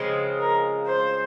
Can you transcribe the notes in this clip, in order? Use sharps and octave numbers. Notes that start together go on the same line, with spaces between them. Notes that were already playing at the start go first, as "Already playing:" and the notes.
Already playing: C#3 F3 G#3 C4
A#4
C5